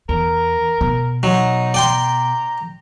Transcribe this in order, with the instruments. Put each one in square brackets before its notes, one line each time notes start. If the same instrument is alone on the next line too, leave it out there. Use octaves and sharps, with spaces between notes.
[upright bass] E2 [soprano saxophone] A#4
[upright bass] B2
[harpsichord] F#3 [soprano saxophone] D#4
[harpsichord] D5 G5 C6 [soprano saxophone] A#5